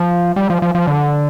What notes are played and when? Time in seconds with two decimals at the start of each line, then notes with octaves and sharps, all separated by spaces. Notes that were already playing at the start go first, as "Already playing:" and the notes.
Already playing: F3
0.36 G3
0.50 F3
0.62 F3
0.75 F3
0.87 D3